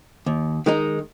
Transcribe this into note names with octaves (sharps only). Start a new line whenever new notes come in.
D#2
D#3 G#3 D#4